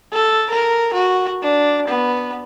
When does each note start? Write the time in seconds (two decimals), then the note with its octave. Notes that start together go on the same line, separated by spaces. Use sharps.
0.13 A4
0.50 A#4
0.94 F#4
1.43 D4
1.88 B3